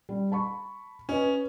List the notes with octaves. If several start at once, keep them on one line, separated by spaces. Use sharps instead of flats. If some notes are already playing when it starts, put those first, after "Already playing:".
G3
A5 B5 C#6
C#4 B4 D#5